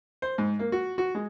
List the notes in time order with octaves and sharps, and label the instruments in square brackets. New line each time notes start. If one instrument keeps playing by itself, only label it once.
[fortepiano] C5
G#2
A#3
F#4
F#4
G#3